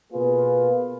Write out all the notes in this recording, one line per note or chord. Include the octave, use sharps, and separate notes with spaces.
B2 A#3 F4 G#4 B4